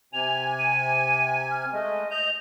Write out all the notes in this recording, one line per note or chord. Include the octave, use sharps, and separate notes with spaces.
C3 G#5 F7
D#7
F6
G#3 A3 D#5
D#5 G6 F7